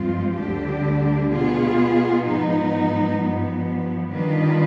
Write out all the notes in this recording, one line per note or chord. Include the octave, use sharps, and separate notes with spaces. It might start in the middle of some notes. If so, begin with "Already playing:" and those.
Already playing: G2 F3 G#3 C4 F4
D2 D3 G3 D4 G4
B2 B3 F4 G#4
G#2 F3 B3 D#4
G2 F3 B3
D#3 G3 D4 F4 B4